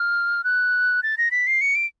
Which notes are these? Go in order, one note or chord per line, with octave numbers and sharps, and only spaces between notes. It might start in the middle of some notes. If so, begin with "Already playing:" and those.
Already playing: F6
F#6
A6
A#6
B6
C7
C#7
D7